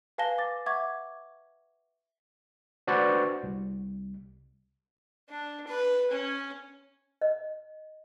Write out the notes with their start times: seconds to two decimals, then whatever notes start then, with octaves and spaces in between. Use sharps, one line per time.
0.18 B4 F5 G#5 A5 A#6 G7
0.38 D6 A6
0.66 E5 F#5 C#6 D6 G#6
2.87 D4 F#4 B4 C5 D5
3.43 C2
5.29 D4
5.67 B4
6.11 C#4
7.21 D#5